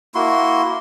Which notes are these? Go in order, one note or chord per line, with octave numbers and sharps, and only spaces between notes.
A#3 E4 F#4 C6